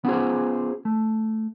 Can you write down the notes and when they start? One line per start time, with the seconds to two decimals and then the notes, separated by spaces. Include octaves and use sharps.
0.05 B3 C#4 F4 G#4 C5
0.85 A3